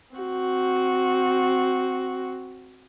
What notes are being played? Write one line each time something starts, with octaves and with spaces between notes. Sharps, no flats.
C4 F#4